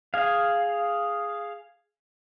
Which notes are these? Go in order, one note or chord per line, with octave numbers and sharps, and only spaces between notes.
G#4 F5